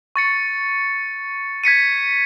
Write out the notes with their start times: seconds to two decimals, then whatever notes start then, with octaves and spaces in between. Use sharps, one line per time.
0.16 C#6 A6 C#7
1.64 G#6 B6 C#7 D#7